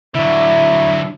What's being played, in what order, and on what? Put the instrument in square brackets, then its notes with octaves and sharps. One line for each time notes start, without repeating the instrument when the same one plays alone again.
[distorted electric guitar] D3 F#3 [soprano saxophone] E4